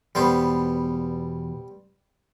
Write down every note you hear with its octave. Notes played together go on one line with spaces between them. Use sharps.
E2 B2 G3 B3 B4 C5